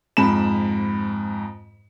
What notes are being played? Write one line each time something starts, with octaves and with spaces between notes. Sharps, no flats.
F2 G#2 B5 E7